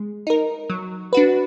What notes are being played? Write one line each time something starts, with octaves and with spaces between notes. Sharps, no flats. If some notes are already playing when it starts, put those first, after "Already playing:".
Already playing: G#3
D#4 A#4
F#3
D4 F#4 B4